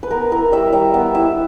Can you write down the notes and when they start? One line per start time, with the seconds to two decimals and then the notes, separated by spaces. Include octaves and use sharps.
0.03 B4
0.11 B3 A#4
0.31 E4 A#4
0.52 G3 E5
0.73 G3 E5
0.94 B3 E5
1.15 E4 E5